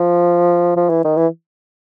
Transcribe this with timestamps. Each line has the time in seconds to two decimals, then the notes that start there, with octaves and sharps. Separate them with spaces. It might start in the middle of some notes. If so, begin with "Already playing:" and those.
Already playing: F3
0.76 F3
0.90 E3
1.04 D#3
1.17 E3